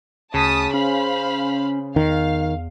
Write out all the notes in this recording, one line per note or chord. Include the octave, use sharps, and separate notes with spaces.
D2 C#3 A5 D#6 B6
C#4 C5 F5 B5
E2 D#3 F5